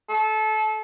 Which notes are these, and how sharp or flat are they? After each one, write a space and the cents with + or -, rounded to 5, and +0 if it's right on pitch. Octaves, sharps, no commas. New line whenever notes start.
A4 -25